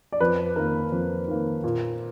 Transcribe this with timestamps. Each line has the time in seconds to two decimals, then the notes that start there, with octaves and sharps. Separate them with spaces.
0.12 D5
0.20 F2 B4
0.56 D#3 A#3 A#4
0.92 F2
1.28 D#3 A#3
1.64 A#2